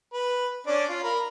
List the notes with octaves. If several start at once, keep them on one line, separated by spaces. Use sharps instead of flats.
B4
C#4 D4 D5
F4
A#4 B5